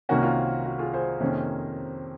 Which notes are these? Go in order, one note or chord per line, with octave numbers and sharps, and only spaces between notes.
C2 C3 D#3 A#3 C#4 F#4
F4
F#4
F4 G#4
G#4 C5
F2 C3 D#3 A#3 C#4